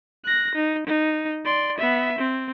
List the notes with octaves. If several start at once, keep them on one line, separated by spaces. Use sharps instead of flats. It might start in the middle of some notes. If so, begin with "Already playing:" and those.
F#6 A#6
D#4
D#4
D5 C6
B3 E5
C4